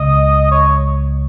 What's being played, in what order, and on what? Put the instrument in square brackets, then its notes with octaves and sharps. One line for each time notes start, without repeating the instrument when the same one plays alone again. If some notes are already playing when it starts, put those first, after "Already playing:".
Already playing: [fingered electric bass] C#2 C#3 [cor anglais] D#5
[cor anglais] C#5